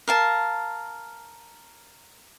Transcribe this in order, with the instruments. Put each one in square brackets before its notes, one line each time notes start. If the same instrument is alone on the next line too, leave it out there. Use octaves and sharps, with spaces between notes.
[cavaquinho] A#4 F5 A5